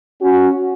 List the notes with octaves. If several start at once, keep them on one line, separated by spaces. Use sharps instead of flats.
C#4 F#4